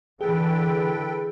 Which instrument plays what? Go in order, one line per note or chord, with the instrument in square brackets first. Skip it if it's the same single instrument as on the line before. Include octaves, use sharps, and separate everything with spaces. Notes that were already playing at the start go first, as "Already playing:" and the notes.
[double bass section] D3 E3 [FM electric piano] G#4 [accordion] A4 B4 G5